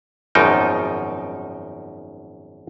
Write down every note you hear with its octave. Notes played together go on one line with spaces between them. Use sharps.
G#1 F#2 B2 F3 D#4 G5